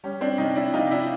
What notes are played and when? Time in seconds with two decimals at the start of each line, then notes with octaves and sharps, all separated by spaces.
0.04 G3 C#4
0.21 C4 D4
0.38 C3 C#4 D#4
0.56 D4 E4
0.74 C3 D#4 F4
0.91 D4 E4